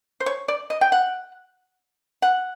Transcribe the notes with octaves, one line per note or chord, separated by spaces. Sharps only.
C5
C#5
D5
D#5
G5
F#5
F#5